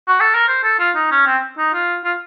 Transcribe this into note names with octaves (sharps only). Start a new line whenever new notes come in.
F#4
A4
A#4
C5
A4
F4
D#4
C#4
C4
D#4
F4
F4